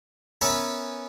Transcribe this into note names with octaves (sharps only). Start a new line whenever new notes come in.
B3 C#4 A#4 B4 E5 G#5